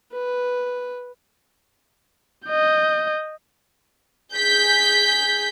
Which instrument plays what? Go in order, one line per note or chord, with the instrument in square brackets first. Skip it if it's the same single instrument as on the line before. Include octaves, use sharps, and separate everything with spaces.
[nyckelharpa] B4
[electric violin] D#5 G6
[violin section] G#4 G6 B6